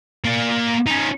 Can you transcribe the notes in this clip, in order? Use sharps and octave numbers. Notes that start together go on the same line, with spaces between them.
A#3 D5
C#4 D#4